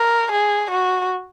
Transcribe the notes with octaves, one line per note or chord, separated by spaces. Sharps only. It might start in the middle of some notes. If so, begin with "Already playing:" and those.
Already playing: A#4
G#4
F#4